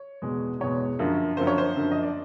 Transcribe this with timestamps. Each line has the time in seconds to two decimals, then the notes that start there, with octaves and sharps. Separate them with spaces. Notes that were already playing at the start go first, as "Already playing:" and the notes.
Already playing: C#5
0.22 E2 B2 G#3
0.60 E2 B2 G#3 C#5
0.99 F#2 D3 F3 A#3
1.37 F#2 D3 F3 A#3 C5
1.47 C#5
1.58 C5
1.76 F#2 D3 F3 A#3
1.91 D#5
2.03 D5